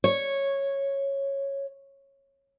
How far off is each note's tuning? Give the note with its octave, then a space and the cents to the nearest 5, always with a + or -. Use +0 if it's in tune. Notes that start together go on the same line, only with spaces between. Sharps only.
C#5 -10